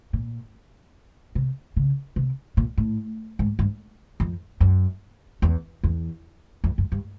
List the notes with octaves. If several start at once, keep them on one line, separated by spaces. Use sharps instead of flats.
A#2
C3
C#3
C3
A#2
A2
G#2
G2
F2
F#2
E2
E2
F2
F#2
G2